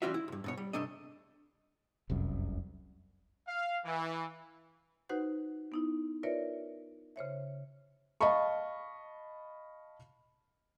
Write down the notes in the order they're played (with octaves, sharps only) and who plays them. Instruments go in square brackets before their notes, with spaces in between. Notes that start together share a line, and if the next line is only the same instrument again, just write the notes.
[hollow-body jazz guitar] E3 G3 C#4 F4 F#4 E5
E4
D2 G2
G2 B2 C#5
G3
G2 C3 A3 D4 D#5
[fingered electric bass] F1 C2 F#2
[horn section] F5
E3
[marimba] D#4 F#4 B4 C5 F#5 G6
B3 D#4 E4
F4 A#4 B4 C#5 D5 E5
C#3 C5 C#5 E5
[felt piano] D#5 F5 A5 B5 C#6